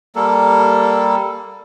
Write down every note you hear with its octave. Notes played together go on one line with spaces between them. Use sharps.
G3 A#3 A4